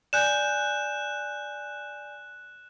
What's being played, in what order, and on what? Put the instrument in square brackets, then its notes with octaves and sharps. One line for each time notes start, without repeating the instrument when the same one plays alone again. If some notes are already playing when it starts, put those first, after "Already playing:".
[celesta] D5 G#5 G6 [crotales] F#6 E7